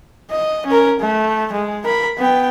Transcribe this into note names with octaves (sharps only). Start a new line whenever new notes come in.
D#5
C#4 A#4
A3
G#3
A#4 B5
B3 G5